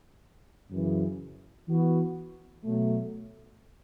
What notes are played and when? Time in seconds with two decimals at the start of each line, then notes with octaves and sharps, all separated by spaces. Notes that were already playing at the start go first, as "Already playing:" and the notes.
0.71 F#2 C#3 E3
1.68 E3 B3 F#4
2.64 B2 F#3 A3